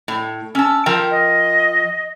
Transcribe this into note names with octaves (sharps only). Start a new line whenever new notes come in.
A2
C#4 A5 E6
F3 A#4 G5
D#5